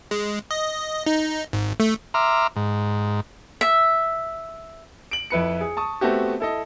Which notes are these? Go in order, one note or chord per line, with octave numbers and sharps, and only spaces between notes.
G#3
D#5
D#4
G#1
A3
E5 A#5 C6 D6 F6
G#2
E5
D7 F#7
F2 E4 B4 C#7
G#4
A5 C#6 D#6
A3 B3 C4 F#4 G4
E4 A4 D#5